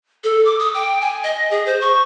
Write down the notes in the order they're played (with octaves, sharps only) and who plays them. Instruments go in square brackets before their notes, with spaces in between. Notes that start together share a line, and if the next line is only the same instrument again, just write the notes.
[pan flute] A4
D6
D#6
G5
G#5
D#5
G#4
C5
C#6